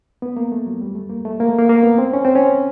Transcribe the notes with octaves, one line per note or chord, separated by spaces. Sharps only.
B3
A#3
A3
F#3
G3
A3
A#3
A3
A#3
A3
A#3
A#3
B3
C4
C#4
C4
C#4